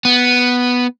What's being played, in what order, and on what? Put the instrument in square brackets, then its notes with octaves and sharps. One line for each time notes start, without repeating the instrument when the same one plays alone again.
[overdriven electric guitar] B3